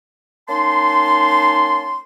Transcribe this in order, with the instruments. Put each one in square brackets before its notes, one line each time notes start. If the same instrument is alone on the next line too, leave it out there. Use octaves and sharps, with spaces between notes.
[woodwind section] A#3 C#4 D#4 A5 C6